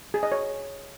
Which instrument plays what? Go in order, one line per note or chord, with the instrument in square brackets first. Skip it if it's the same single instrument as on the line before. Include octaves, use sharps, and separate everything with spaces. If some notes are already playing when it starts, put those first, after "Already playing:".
[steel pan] G#4
D#5
C#5